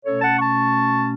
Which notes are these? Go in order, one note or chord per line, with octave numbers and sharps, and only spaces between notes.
B2 A3 C#4 A4 C#5
F#5 A5
A5 C#6